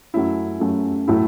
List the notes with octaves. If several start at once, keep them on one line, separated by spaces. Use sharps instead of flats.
F#2 F#3 A3 C#4 E4
F#2 F#3 A3 C#4 E4
A2 F#3 A3 E4